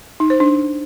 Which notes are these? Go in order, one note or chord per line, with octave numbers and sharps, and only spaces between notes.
D#4
C5
D4